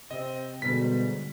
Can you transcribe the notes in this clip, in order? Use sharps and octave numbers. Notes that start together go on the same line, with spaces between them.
C3 C4 D#5
D2 G#2 B2 D3 G3 G#3 D4 B6